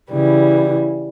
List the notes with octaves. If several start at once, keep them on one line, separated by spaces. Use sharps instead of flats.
C#3 E3 G3